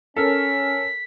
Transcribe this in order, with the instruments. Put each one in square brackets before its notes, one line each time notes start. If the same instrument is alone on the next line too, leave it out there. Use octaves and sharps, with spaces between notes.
[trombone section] C#4 [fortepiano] A4 A#4 [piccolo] B6